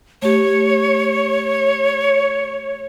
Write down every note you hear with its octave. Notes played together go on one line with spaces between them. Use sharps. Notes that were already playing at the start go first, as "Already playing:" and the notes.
A3 G4 C#5